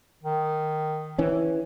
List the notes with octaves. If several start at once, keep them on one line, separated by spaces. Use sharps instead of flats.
D#3
E3 C#4